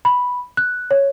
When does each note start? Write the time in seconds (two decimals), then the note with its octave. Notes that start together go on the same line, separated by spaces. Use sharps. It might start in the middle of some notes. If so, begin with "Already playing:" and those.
0.05 B5
0.57 F#6
0.91 C#5